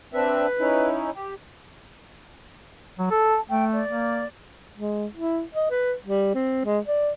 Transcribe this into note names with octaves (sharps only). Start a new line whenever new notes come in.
C4 D4 B4 E5
C#4 D#4 E4
G4
F#3
A4 A5
A3 G5
D5
A#3
G#3
E4
D#5
B4
G3
C4
G#3
D5